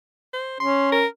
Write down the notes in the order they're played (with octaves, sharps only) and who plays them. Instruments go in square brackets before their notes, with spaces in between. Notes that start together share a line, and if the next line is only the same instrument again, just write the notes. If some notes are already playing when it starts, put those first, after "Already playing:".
[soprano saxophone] C5
[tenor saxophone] C#4 [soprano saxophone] C6
[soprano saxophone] A#4